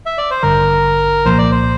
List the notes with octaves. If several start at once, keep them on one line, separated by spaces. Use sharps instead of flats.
E5
D5
C5
A1 G2 D3 A#4
C2 A#2 F3 A#3 C5
D5
C5